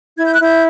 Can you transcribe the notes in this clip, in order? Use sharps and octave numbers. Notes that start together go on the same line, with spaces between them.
E4 G#6
G6
F#6
E4 G6